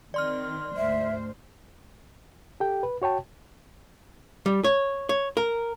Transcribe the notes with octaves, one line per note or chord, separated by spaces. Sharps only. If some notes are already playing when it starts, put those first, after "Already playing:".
D#3 C4 D5 C6 F6
D2 G#2 C5 E5
G4 A4 G5
B4
F#4 C#5 G5 A5
G3
C#5
C#5
A#4